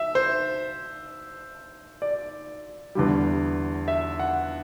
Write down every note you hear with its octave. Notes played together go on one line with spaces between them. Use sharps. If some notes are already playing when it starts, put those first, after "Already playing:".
Already playing: E5
C5
D5
E2 D3 G3
E5
F#5